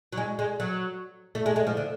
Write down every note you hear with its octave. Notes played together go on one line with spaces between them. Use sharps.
F#3
G#3
G#3
F#3
A3
G#3
G#3
F3
D3